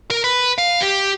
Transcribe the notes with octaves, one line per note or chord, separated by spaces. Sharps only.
A#4
B4
F5
G4